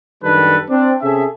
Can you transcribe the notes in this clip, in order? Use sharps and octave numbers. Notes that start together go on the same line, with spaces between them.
F#2 D#3 G3 D4 A4 B4
C4 D4
C3 C#4 G#4 A4 E5